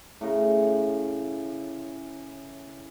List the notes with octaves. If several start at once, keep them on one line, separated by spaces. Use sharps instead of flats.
A2 C#3 A#5